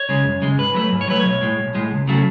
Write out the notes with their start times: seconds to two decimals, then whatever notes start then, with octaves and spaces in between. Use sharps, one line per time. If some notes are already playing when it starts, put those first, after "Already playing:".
Already playing: C#5
0.09 C#3 G#3
0.25 F#2
0.42 C#3 G#3
0.58 G#2 B4
0.74 F#3 A3 B4
0.92 G#2
1.01 C#5
1.08 F#3 A3 B4
1.20 B1 C#5
1.41 A2 G#3
1.58 B1
1.74 A2 G#3
1.91 C#2
2.07 C#3 F#3 A3